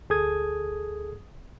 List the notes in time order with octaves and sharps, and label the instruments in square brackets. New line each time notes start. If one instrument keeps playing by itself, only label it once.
[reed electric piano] D2 G#4 A4 D#6 G#6